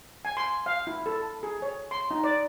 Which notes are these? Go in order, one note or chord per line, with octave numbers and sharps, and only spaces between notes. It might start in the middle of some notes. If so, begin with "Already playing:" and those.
G#5
C6
F5
E4
A4
G#4
C#5
C6
D#4
D5